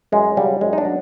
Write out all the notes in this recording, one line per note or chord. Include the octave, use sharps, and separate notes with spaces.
F#2 G#3
C#3 F#3 G3
F#2 G#3
D#4
D4
F#3